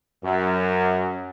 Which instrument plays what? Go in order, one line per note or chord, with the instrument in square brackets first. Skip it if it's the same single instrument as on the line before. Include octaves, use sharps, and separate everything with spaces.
[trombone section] F#2